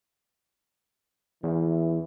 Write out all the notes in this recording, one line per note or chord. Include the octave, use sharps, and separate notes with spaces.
E2 E3